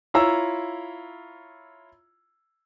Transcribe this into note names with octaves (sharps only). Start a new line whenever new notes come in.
E4 F4 C#5 A#5 E6